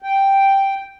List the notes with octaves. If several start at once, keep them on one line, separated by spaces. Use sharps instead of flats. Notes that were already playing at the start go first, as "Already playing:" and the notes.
G5